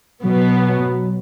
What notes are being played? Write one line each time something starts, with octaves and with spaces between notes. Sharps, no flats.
B2 F#3 B3
F#3